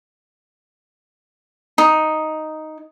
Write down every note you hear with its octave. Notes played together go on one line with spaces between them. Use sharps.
D#4